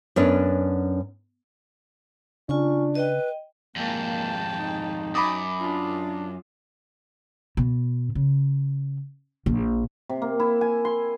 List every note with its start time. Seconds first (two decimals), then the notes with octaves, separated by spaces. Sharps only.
0.16 F#2 B3 C#4 D4
2.49 C#3 D4 F4 G#5 C#6
2.95 B4 D#5 G5
3.76 F2 G#2 A#3 G5 A5
4.57 D#4
5.15 F#2 B5 D6 D#6
5.60 D4 F4
7.57 B2
8.15 C#3
9.46 A#1
10.09 C3
10.22 A#3
10.40 E4
10.61 G#5
10.85 C6